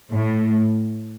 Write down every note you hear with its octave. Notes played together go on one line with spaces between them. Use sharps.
A2